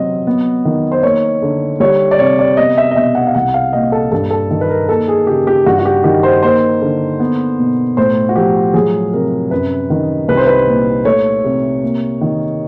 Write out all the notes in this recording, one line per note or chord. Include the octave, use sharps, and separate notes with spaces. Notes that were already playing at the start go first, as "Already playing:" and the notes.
Already playing: C3 F#3 C4 D#5
B3
D#3
C5
A#3 C#5
D3
G3 C#5
D5
C3 C#5
D5
B3 D#5
E5
D#5
B2 E5
F#5
F5
C2 F#5
F5
A#2 D#5
A4
G2 A4
A4
D#3
B4
A#4
A#3 A4
G#4
C#3 G4
G4
G2 F#4
F#4
G4
D#3 G4
C5
A#3 C5
D3
B3
B2
A2 C5
F#4
F3 G4
F#3 G#4
C3 A#4
F#2 B4
D#3
C2 B4
C5
B4
A#2
A3 C#5
C3
A#3
D#3